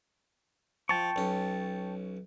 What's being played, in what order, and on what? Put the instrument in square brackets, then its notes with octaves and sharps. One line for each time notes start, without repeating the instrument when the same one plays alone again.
[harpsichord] F3 [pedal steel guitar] G5 A5 C#6
[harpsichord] B1 C#4